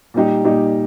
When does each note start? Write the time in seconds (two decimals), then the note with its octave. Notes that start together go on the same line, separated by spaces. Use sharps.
0.14 A#2 G3 D#4 G4
0.44 A#2 G3 D#4 G4